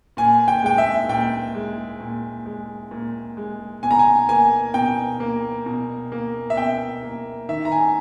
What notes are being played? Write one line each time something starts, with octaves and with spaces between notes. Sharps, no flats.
A#2 G#5
G5
G#3 G5
E5
A#2 G5
G#3
A#2
G#3
A#2
G#3
B2 G#5
A#5
G#5
A#3 G#5
B2 G5
A#3
B2
A#3
E5
B2 G5
A#3
D#3 E5
A#5
G#5